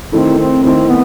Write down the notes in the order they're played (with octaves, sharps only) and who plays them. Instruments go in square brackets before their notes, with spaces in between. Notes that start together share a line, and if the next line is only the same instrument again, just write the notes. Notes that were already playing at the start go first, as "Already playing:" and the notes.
[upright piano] D#3 A3 E4 [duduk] C4
[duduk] C4
[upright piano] D#3 A3 E4 [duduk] C4
[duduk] B3